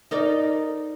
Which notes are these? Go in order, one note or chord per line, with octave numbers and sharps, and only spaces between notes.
D#4 A#4 D5